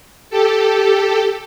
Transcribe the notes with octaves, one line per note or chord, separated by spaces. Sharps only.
G4 A4